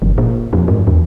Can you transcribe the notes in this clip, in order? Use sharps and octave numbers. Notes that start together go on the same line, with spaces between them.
G1
A#2
F2
G#2
E2